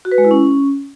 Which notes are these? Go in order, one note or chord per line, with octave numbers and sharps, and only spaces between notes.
F#4
B4
G#3
E4
C#4